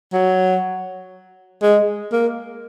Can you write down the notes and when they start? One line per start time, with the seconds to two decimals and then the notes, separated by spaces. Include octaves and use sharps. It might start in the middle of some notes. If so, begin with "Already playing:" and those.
0.13 F#3
1.62 G#3
2.12 A#3